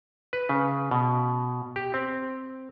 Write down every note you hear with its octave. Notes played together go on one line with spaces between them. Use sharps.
B4
C#3
B2
G4
C4